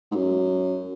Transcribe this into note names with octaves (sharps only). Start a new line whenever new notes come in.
G#2
F#2